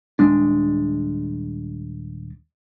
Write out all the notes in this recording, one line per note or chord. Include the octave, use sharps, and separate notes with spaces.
D#1 G#3 D4